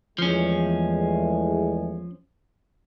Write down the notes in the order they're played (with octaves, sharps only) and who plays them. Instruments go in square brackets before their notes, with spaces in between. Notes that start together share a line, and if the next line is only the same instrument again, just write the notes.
[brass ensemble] E2 G#3 A3 [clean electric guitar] F3 C#4